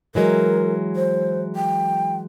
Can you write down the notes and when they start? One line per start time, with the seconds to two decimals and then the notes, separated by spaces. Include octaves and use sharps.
0.15 E3 F#3 G#3 A#4
0.96 C5
1.56 G5